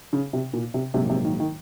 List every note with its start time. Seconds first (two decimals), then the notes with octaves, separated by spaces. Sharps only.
0.13 C#3
0.33 C3
0.53 A#2
0.74 C3
0.93 A#1 G#2 C3 F#3 A#3
1.10 C3
1.25 D#3
1.40 D#3